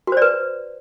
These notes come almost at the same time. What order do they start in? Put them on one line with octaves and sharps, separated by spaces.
F#4 C5 D5 B4